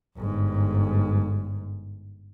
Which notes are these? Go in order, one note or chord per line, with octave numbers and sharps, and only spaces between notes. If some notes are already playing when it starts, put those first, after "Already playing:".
G1 G#2